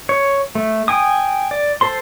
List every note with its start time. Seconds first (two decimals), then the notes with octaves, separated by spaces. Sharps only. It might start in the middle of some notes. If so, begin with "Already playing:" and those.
0.09 C#5
0.55 A3
0.88 G5 G#5 D#6
1.51 D5
1.81 A4 C5 C6